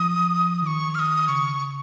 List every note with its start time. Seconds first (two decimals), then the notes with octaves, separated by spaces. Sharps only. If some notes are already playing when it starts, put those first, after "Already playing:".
Already playing: F3 D#6
0.62 D#3 C#6 D#6
0.95 F6
0.99 D#6
1.28 C#3 C#6